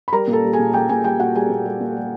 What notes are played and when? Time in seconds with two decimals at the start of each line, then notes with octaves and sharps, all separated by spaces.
0.08 B5
0.12 G3 A#4 A#5
0.27 A#2
0.33 A4 A5
0.44 G3
0.53 G#4 G#5
0.59 A#2
0.73 G3 G4 G5
0.89 A#2 G#4 G#5
1.04 G3 G4 G5
1.20 A#2 F#4 F#5
1.35 G3 G#4 G#5
1.50 A#2
1.65 G3
1.80 A#2
1.97 G3